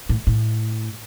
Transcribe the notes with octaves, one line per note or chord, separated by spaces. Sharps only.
A2
A2